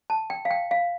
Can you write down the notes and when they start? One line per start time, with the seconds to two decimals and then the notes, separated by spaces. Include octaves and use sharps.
0.10 A5
0.30 G5
0.45 F5
0.51 G5
0.71 F5